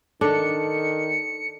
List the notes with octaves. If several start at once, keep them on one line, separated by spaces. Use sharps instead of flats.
D#3 D4 A4 C#7